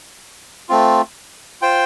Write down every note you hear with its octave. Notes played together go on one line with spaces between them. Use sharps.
A3 C4 F4
F4 C5 G5